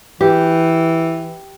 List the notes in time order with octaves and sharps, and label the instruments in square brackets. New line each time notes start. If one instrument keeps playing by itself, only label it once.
[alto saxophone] E3 [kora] G4